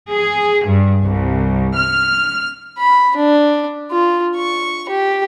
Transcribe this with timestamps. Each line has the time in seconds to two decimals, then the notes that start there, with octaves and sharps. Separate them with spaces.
0.11 G#4
0.67 G2
1.04 C2
1.76 F6
2.79 B5
3.16 D4
3.91 F4
4.36 C#6
4.89 G4